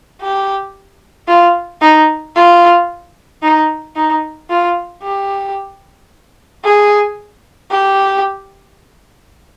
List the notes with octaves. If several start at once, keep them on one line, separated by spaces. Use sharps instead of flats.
G4
F4
D#4
F4
D#4
D#4
F4
G4
G#4
G4